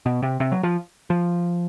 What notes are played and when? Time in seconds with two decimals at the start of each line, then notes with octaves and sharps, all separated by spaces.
0.06 B2
0.22 C3
0.40 C3
0.52 F#3
0.63 F3
1.10 F3